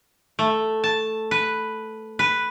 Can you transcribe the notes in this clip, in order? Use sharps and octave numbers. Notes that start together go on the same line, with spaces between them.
A3
A5
B4
B4